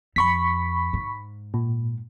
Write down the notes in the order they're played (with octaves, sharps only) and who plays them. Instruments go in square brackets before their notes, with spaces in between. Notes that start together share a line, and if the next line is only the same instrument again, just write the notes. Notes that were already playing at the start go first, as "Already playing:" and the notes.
[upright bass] F2 [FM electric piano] B5 C#6 B6
[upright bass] G#2
[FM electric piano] A#2